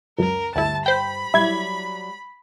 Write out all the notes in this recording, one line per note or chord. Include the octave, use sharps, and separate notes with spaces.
C#2 F#2 A#4
D2 G2 E4 A5
C5 G5 B5
F#3 G3 E4 G#6